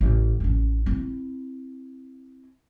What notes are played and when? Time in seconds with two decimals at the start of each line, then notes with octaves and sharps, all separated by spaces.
0.01 A1
0.40 A1 C#4
0.86 C4 E4